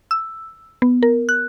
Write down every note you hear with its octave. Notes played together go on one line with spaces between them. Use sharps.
E6
B3
A#4
F#6